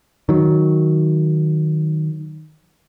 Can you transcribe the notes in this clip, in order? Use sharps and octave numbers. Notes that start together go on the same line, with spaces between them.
D#3 F#3